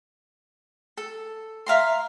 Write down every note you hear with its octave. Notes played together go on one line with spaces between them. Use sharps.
A4
E5 F5 A#5 C6